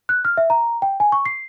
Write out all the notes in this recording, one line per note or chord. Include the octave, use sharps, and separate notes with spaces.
F#6
F6
E5
A#5
G5
G#5
C#6
C7